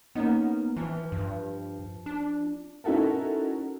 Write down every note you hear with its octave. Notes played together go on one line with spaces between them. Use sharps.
A#3 B3 C#4 D#4
E3 F3
G2
D4
C#4 D#4 E4 F#4 A4 A#4